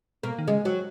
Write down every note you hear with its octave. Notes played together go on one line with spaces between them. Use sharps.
B2 A#3
D#3
C#3 G#3
F#3